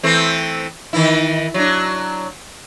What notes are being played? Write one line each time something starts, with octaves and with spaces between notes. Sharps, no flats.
E3 A3 C4
D#3 E3 E4
F#3 D4